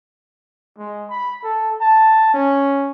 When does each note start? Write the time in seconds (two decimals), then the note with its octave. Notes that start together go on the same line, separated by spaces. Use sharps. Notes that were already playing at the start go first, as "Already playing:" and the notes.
0.78 G#3
1.10 B5
1.43 A4
1.81 A5
2.34 C#4